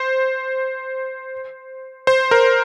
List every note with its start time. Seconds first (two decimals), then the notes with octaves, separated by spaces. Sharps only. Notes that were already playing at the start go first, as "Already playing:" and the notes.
Already playing: C5
2.07 C5
2.31 A#4